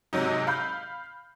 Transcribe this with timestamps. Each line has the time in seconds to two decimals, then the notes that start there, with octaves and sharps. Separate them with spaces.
0.13 G#2 C3 F#3 D#4
0.47 F5 B5 G6